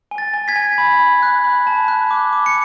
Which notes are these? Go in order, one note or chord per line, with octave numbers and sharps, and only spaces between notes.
G#5
A6
G#5
G#6 B6
G#5
B5
B5
F#6
B5
A5
F#6
D6
D6
C#7